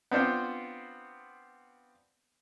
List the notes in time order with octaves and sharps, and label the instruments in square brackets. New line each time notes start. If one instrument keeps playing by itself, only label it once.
[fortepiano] B3 C4 D4 F4 C5